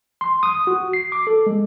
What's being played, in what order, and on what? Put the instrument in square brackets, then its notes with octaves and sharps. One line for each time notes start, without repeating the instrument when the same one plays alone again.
[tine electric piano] C6
D#6
F#4
C7
D6
A4
G#3